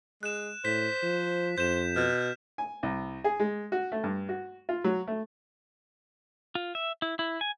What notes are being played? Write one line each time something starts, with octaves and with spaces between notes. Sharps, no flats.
G#3 F#6 E7
A2 C5 B6
F3
F2 C5 G6 E7
B2 F6
G#5
C2
G#4
G#3
F#4
A3
G2
F#4
F4
F#3
A3
F4
E5
E4
E4
G#5